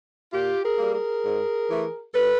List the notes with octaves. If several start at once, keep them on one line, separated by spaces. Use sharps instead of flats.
A#2 F4 G4
G#4 A#4
G3 A#3
G#4 A#4
G#2
E3 A3
G2 A4 B4